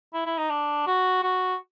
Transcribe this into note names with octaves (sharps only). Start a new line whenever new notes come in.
E4
E4
D#4
D4
F#4
F#4